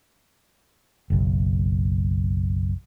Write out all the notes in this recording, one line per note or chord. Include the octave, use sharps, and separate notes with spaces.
F#1 B1